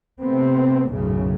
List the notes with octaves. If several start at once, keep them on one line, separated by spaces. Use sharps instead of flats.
C3 A3 B3 C4
B1 F#2 A2 C#3